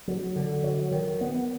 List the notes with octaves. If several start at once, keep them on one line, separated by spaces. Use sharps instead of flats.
F#3
D3
F#3
D#3
B3